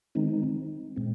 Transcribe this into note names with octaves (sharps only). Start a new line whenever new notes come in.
D#3 G#3 C4 D#4
A#2 G#3 C4